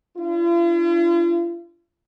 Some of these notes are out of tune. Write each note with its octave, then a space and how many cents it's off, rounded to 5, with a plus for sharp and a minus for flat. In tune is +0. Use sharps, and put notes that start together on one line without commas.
D4 +0 F4 -45